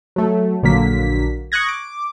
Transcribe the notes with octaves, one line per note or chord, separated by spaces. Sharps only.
F#3 A3
A#1 D3 F#3 A#3 B6
C#6 D#6 F#6 G#6 A#6
D6